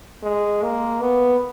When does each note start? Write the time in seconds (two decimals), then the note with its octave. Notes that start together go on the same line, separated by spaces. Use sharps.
0.23 G#3
0.63 A#3
1.02 B3